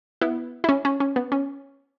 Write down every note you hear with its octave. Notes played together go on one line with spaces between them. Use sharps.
B3 E4
E4
C#4
C#4
C#4
B3
C#4